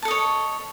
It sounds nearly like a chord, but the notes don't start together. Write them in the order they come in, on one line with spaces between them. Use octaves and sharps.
A5 A4 D#5 C#5